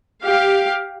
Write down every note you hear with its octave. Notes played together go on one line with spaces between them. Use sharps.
G4 F5